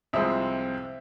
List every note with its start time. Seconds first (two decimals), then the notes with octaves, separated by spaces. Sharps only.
0.13 C2 C3 F3 G#3 C4 E5